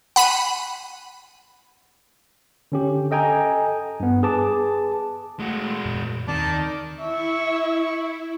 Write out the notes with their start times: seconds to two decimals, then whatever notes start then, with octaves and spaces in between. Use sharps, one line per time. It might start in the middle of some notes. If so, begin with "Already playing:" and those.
0.16 F#5 B5 B6 D#7
2.72 D3 C#4 G4
3.11 A4 D#5 G5 G#5 A#5
4.00 G2 B3
4.23 G#4 B4 A5 D6
5.40 G#3 A3 F#4
5.85 F2 A#2 E3
6.28 D#2 D#3 C4 D5 A5 D6
7.01 E4 E5 C#6